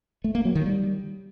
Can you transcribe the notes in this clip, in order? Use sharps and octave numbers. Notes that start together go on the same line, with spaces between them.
A3
A#3
F#3
D#3
G3